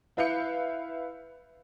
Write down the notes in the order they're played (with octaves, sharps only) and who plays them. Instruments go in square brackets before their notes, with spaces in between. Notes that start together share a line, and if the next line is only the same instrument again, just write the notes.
[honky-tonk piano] E4 B4 E5 F5 G6 C#7